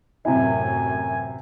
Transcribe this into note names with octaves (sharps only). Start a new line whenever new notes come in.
A1 F#2 A2 C3 E4 G#5